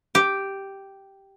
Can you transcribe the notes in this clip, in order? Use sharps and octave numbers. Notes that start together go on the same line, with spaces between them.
G4